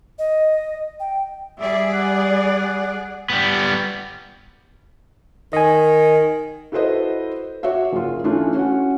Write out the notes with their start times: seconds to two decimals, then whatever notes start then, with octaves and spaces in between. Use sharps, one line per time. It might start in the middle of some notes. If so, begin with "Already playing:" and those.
0.19 D#5
1.00 G5
1.60 G3 G#4 D5 E5
1.93 F#5
3.30 G3 B3
5.53 D#3 D#5 G#5
6.72 E4 F#4 A4 B4 C5 D#5
7.63 F#4 C#5 D5 E5
7.92 F#1 F4
8.24 E3 A3 C#4 D4 E4 F4
8.54 C#4 F#4 F#5